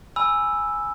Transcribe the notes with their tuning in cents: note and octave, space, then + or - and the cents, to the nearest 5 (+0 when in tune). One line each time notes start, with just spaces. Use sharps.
G#5 +0 B5 +0 E6 +0